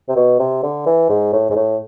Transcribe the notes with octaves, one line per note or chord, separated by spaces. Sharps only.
C3
B2
C3
D3
E3
G#2
A2
G#2
A2